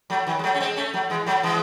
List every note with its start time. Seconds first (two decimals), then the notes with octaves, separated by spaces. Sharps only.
0.10 F#3 A3
0.27 D#3 F#3
0.39 G#3
0.44 F#3 A3
0.55 C#4
0.60 G#3 C4
0.77 A3 C#4
0.93 F#3 A3
1.10 E3 G#3
1.26 F#3 A3
1.43 E3 G#3